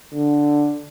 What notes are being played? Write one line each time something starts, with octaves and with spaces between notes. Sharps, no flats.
D3